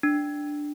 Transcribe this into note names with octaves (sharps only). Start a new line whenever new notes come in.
D4